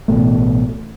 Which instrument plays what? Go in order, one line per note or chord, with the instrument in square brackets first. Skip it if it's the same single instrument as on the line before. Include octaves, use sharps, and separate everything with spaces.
[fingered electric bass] A1 B2 A3